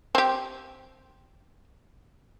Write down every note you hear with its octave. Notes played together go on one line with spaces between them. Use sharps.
C4 G4